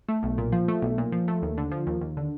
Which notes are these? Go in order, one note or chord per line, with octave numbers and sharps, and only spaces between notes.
A3
B1
A#2
F3
A3
B1
A#2
F3
A3
D#2
D3
F3
D#2
D#2
D3